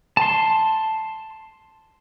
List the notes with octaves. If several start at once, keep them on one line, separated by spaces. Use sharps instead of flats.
A5 C6